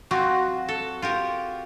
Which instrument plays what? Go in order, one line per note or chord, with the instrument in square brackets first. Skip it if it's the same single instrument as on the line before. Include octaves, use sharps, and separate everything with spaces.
[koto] F#3 C4 F4 [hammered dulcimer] F#4
[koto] A4
F4 G4 A#4